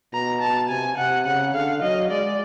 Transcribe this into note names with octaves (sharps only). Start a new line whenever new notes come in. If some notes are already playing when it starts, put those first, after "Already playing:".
B2 A#5
A5
C3 G#5
C3 F#5
C#3 F#5
D3 F5
F#3 D#5
G#3 D5